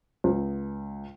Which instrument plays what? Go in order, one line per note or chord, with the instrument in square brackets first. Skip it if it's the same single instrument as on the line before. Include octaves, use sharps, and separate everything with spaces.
[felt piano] C#2